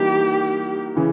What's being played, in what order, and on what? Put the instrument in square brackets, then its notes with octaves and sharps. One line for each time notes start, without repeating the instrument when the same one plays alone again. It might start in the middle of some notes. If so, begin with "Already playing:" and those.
Already playing: [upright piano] E3 G3 A#3 D#4 F#4 [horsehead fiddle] G4
[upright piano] C#3 E3